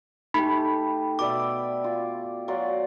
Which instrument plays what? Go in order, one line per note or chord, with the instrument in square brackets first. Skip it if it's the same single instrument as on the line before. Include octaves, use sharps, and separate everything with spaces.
[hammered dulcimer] A3 G4 [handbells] D#4 [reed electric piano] B5
[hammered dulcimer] B2 D5 E5 [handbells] D6
[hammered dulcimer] F4
F#3 F4 D5